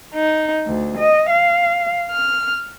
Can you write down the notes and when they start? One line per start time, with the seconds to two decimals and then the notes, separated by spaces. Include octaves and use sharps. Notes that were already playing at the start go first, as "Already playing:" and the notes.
0.15 D#4
0.67 D2
0.97 D#5
1.29 F5
2.12 F6